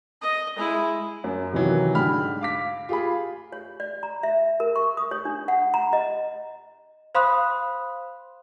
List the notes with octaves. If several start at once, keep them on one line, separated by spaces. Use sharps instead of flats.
D#5
G#3 E4
F#2
C3 D#3 E3 F#3
G#2 D3 G5 B5 F6
F5 D6 B6
F4 G4 G#4 B5
C#5
D5
A#5
E5
A#4
C#6
D#6
C#5
D4
F#5
A#5
D#5
C5 F5 B5 C6 D#6 F#6